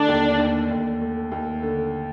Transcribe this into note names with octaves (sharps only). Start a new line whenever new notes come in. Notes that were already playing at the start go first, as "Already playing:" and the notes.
Already playing: D3 A3 D4
D#2
D#2
D#2
A3
D#2
D3